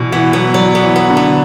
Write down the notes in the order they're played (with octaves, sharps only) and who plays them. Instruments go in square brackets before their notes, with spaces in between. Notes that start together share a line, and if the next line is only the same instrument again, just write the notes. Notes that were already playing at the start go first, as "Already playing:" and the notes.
Already playing: [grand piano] B2 E3 [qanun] D5
[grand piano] E3 [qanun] B3
[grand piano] F#3 [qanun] B3
[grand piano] F#3 [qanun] D5
[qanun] B3
[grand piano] E3
[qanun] B3
[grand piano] D3
[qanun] B3